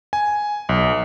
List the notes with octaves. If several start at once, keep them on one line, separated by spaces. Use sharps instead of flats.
G#5
B1